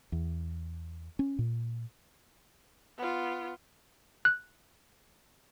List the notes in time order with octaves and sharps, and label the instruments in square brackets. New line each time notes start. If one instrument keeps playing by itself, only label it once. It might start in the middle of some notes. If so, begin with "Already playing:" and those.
[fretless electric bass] E2
C#4
A#2
[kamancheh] B3 F4
[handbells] F#6